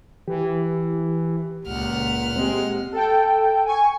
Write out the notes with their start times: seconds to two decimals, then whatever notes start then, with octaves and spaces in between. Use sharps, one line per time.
0.28 E3 G4
1.67 C#2 A#2 F#5 F6
2.36 G#3 C4 G4
2.92 A4 G5
3.65 G#5 C#6